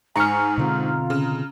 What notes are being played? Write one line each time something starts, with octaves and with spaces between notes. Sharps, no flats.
G#2 G#5 A#5 C#6 F6 C#7
B2 D3 C4 F4
C#3